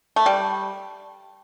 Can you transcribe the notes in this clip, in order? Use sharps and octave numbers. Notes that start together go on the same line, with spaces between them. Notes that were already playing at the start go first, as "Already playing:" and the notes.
A3
G3